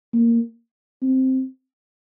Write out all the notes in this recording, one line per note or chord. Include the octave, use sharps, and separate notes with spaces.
A#3
C4